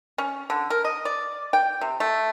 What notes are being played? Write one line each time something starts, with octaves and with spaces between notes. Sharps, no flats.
C#4
D3
A#4
D#5
D5
G5
C3
A3